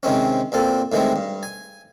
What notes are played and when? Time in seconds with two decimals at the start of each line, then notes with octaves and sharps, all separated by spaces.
0.03 C3 D#3 G#3 C4 C#4
0.52 E2 A#2 C4 A4
0.92 A2 D#3 E3 G#3 C4
1.16 G2
1.43 G#5